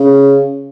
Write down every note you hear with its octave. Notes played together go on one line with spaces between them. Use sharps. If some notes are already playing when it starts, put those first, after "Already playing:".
Already playing: C#3